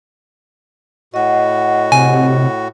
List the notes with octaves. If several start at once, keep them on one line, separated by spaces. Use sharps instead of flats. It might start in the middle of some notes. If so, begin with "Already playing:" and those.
A2 F#4 D#5 F#5
C3 G#5